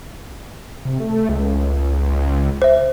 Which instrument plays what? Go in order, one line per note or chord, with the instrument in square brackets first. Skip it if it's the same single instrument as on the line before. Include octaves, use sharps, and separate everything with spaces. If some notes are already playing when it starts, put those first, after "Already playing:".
[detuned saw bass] C3
A3
C#2
[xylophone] C5 E5